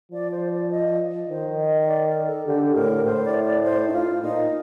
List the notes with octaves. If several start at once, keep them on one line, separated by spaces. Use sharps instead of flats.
F3 D5
C5
D5
D#5
D#3 C5
D#5
D#5
D5
A#4
A4
D3 G4
A2 A#4
A2 C5
D5
D5
C5
D#4
F4
A#2 D#4